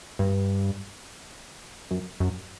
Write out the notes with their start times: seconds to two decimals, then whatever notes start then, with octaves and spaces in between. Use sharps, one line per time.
0.19 G2
1.91 F#2
2.20 F#2